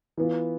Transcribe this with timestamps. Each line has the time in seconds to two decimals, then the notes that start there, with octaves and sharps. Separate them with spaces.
0.17 E3 B3 F4